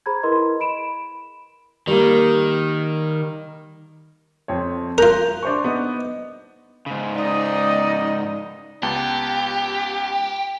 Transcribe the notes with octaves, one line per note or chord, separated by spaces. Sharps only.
G#4 C5 A#5 B5 G#6
E4 A#4 B4 D#5 C6
B5 D7 E7
D#3 G3 A#3
F2 C4 C#5
F4 A#4 F#6 G6 A#6
D4 C5 C#6
B3 D#4
G#2 C#3
D#4 D5 D#5
C#2 B3 G4 A5